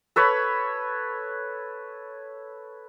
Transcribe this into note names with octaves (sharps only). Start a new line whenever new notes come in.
A4 B4 C#5 B5